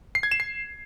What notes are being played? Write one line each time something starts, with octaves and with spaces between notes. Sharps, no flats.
C7
G#6
E7
C7